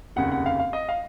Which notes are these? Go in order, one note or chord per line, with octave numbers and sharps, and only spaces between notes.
F1 D#2 C#3 F#5
F#5
F5
F5
D#5
F5